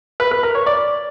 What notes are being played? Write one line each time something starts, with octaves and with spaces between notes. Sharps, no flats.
B4
B4
A#4
C#5
D5